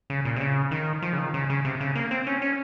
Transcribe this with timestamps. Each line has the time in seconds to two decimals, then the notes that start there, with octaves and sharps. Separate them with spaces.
0.10 C#3
0.25 A#2
0.36 C3
0.41 C#3
0.71 D#3
1.02 F3
1.13 C#3
1.18 D#3
1.34 C#3
1.50 C#3
1.65 C3
1.80 C#3
1.95 A#3
2.11 C4
2.27 C#4
2.42 C#4